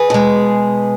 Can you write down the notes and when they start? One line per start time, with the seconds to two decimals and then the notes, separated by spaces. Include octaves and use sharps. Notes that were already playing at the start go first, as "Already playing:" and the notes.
Already playing: G#4 B4
0.10 B2 G#3